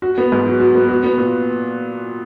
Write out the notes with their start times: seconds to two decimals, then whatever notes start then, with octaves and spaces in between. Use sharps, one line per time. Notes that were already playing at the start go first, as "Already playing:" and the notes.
0.02 F#4
0.18 B3
0.32 G#2
0.46 F#3
0.60 F#4
0.75 B3
0.89 F#4
1.04 B3
1.18 A#2